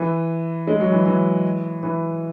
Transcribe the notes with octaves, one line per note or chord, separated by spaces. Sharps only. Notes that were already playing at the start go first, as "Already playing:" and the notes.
Already playing: E3
G#3
F#3
E3
E3
E3